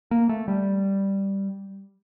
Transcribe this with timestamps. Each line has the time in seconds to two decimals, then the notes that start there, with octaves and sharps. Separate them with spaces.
0.11 A#3
0.29 A3
0.48 G3